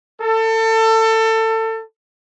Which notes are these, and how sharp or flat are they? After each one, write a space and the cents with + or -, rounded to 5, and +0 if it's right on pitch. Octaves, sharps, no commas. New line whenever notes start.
A4 +25